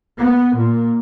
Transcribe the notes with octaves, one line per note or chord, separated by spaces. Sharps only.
B3
A#2